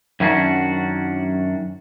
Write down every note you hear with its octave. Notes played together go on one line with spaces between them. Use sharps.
F#2 D#3 C#4 D4 F#4